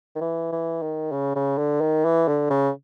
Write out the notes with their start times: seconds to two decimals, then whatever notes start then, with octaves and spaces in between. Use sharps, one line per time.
0.16 D#3
0.21 E3
0.52 E3
0.82 D#3
1.12 C#3
1.36 C#3
1.58 D3
1.81 D#3
2.05 E3
2.28 D3
2.50 C#3